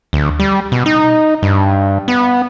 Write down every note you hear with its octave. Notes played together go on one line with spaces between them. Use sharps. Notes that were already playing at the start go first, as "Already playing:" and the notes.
D2
G3
B2
D#4
G2
B3